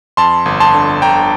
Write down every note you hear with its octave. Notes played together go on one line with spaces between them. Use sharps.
F2 A5 C6
G1
A5 C6
D3
G1 G5 A#5